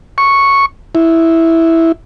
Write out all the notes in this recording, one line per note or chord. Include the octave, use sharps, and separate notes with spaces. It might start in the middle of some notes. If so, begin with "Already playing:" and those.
C#6
E4